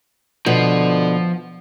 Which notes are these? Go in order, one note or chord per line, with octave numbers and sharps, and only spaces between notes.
B2 D3 F3